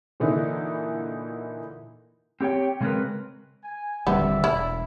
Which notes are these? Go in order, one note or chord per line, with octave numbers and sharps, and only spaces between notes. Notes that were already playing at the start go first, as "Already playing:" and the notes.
A#2 D3 E3 A#3 D#4 E4
C4 G4 C#5 G5
C#3 G#3 A3 C4 A#4 B4
G#5
D#1 D3 G3 B3 C4 D5 E5
E1 E4